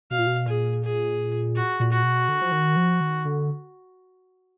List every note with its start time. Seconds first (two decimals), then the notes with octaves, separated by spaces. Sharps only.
0.11 B2 F5
0.18 A#2
0.27 B2
0.47 A#2 G#4
0.84 G#4
1.56 F#4
1.80 A#2
1.92 F#4
2.03 B2
2.28 D3
2.41 F3
2.52 D#3
2.76 F3
3.01 D#3
3.25 D3